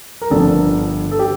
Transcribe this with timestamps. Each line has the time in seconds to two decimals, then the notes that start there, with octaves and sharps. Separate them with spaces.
0.22 A#4
0.30 G1 G2 D3 F3 A4
1.11 A4
1.19 G4